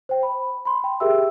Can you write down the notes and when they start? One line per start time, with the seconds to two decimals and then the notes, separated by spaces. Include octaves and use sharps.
0.09 C5 G5
0.23 B5
0.65 B5 C6
0.84 G5
1.00 G4 G#4 A#4 E5 G5 E6